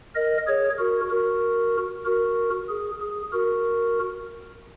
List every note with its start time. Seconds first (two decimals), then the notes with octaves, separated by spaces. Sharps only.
0.15 A#4 D#5
0.47 G#4 C#5
0.78 F#4 A#4
1.10 F#4 A#4
2.05 F#4 A#4
2.69 G#4
3.01 G#4
3.33 F#4 A#4